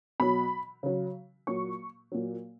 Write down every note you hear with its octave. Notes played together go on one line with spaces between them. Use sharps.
B2 F#3 B5
C#3 F#3
A#2 F#3 C#6
A#2 F#3